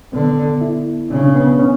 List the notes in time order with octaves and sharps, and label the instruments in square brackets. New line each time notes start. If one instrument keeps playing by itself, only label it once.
[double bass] D3 [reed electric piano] B3
[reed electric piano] E4
[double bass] C#3 [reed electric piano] D4
[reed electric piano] C#4
B3
B3
C#4